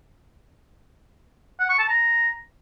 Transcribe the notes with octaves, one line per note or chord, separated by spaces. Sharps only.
F#5
C#6
A5
A#5